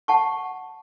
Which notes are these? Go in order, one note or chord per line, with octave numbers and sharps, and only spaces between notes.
F#5 A5 C#6